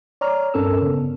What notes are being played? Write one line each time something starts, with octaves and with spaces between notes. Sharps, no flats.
C#5 D5 A#5 F6
G2 C4 C#4 A4 A#4 E6
C#3 B3